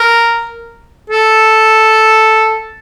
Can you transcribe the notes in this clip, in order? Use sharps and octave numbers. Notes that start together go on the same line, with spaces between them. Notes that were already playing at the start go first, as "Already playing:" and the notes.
Already playing: A#4
A4